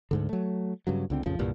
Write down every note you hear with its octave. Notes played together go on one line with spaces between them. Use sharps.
D2 G#2 D3
F#3 A3
G2 C#3 F#3
C#2 D3 C4
A1 F2 C#3 F3
C2 G2 A#2